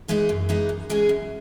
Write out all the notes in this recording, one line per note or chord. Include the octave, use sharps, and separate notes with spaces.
E3 G#3 B3 D#4
F#2
E3 G#3 B3 D#4
F#2
E3 G#3 C#4 G#4
F#2